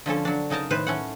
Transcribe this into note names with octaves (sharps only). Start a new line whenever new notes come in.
D3 F3 C#4 A4
F#3 D4
C#3 D#4 A#4 A5 A#5
A2 D#3 B4 C5
A3 C#4 F#5